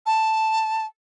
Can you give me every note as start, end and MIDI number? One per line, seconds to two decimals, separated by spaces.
0.06 0.86 81